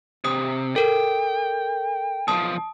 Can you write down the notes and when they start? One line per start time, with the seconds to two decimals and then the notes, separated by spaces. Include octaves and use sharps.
0.24 C3 D#6
0.76 A4 A#4 G5
2.28 B1 F3 A5 D#6